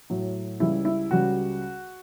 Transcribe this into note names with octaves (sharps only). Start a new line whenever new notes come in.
A2 F#3
C#2 C#3 G3 E4
E4
C#2 C#3 G3 F#4